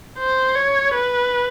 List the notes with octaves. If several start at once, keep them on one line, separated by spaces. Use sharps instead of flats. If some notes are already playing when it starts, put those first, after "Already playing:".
C5
C#5
B4